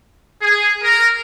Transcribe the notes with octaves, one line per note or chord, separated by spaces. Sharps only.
G#4
A#4